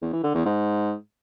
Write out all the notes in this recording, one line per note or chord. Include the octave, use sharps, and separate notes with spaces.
E2
E3
D3
E2
G#2